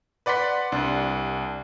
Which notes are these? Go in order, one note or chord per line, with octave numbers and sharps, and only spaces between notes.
B4 D5 F#5 C6 B6
C2 D4